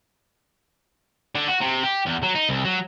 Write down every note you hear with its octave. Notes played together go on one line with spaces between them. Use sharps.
D3
F#4
C3
G4
E2
F#3
D#4
C2
F#3